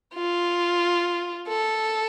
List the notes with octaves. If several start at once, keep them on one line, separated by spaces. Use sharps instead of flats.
F4
A4